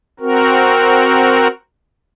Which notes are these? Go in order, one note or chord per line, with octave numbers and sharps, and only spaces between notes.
C4 F#4 A#4